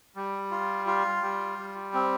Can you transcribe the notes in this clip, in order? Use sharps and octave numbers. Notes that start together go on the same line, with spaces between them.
G3
F4
F4
G3
G3
C4